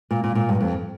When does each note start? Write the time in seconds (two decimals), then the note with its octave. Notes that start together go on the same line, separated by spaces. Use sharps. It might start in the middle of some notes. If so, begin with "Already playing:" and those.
0.11 A#2
0.24 A#2
0.35 A#2
0.49 G2
0.61 F2